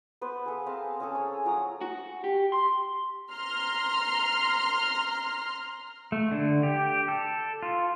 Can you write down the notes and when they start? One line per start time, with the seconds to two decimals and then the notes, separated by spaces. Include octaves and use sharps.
0.21 B3 B4 C5
0.46 G#4 A4 F5
0.66 C4 A#4 F5 A5
1.00 C#4 G#4 A4
1.15 C#5
1.45 F3 F#3 F#4 A#5
1.81 F#4
2.24 G4
2.52 C6
3.33 A#5 C6 F6
6.12 A3
6.31 D3
6.63 G4
7.08 A4
7.63 F4